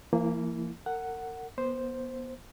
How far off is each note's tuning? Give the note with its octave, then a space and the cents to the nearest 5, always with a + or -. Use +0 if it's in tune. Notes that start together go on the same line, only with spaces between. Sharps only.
E3 +45 A#3 -10 E4 +0
A#4 -35 F#5 +5
B3 -25 C5 +0